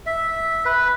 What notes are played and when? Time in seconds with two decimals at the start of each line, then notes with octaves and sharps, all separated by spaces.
0.06 E5
0.66 B4